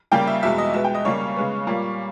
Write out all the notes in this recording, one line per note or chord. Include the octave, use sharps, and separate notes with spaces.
C#3 G3 A#3 G5
E5
E2 B2 G#3 E5
D#5
B2 G#3 B3 E5
G5
D#5
C#3 G3 A#3 C#5
C#3 G#3 B3
A#2 G3 A#3